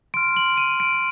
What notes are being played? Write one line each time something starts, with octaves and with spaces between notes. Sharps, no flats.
C6 F6 D7
F#7
D#7
D7